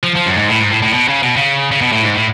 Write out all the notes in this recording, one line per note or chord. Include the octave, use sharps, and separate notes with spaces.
F3
F3
F#2
G#2
A2
G#2
A2
A2
B2
C#3
B2
C#3
C#3
B2
A2
G#2
A2